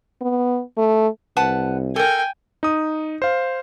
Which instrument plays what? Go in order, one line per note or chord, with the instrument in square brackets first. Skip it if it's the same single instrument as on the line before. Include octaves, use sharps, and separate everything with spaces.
[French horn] B3
A3
[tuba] C2 [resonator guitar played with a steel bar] B4 F#5 A5
[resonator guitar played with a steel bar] A4 A#4 [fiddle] G5 G#5
[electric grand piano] D#4 D#6
C5 F5